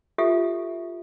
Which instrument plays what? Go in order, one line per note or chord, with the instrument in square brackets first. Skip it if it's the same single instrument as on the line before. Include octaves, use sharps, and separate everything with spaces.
[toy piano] F4 G4 A4 E5